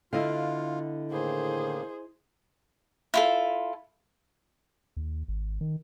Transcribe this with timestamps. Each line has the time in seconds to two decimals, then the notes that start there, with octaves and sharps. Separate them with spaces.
0.13 D3 B3 E4 F4 D#5 F5
1.11 A2 D#3 A#3 G#4 C5
3.14 E4 F4 A4
4.97 D#2
5.28 G#1
5.61 D#3